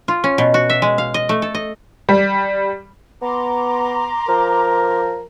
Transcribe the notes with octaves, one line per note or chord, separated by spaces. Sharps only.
F4
C#4
B2
F#4
E5
G#3
F5
D#5
A3
A4
D#5
G3
B3 A#5 C6 D6
F3 A#4